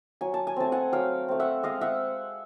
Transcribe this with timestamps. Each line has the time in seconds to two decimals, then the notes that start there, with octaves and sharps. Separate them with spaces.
0.21 F#3 G#5
0.34 A5
0.47 G#5
0.56 A3 C4 A5
0.72 F#5 G#5
0.92 F#3 F5 G5
1.28 A3 C4
1.40 E5 F#5
1.63 G#3 D#5 F5
1.81 E5 F#5